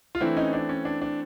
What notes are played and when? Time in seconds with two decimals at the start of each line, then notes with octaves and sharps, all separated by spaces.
0.15 F4
0.21 E3 A3 C4 D4 E4
0.37 C#4 D#4
0.53 D4
0.69 C#4
0.85 D4
1.01 D4